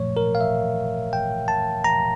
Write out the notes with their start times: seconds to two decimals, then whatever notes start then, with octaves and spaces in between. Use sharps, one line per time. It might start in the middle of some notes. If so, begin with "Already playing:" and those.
Already playing: A#2 F3 A3 C#5
0.17 A#4
0.35 F5
0.41 E5
1.13 G5
1.48 A5
1.84 A#5